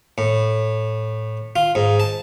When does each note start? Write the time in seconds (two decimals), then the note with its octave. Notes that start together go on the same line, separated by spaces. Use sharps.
0.18 A2
1.56 F4
1.75 G#2
2.00 A5